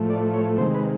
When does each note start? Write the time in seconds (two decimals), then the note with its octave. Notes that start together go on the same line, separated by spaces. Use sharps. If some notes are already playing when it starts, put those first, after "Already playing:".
Already playing: A2 F3 A3
0.10 D5
0.34 C#5
0.58 C3 D#3 G#3 C5
0.74 B4